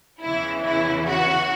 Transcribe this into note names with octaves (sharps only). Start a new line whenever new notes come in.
E2 C#3 E3 E4
E4
F#4